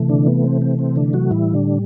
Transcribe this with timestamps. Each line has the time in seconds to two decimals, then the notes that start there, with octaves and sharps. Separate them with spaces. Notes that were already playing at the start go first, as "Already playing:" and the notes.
Already playing: C3 E3 A3
0.09 D3 D4
0.27 B3
0.44 C4
0.62 C4
0.79 C4
0.96 D3 D4
1.13 F#3 F#4
1.31 A2 E3 G3 E4
1.54 D3 D4